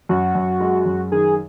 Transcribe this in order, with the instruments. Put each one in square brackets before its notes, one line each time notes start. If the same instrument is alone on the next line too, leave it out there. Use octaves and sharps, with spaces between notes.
[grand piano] F#2 [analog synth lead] F#4
[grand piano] F#2
G#3
F#2
[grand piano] D#3 [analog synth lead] G#4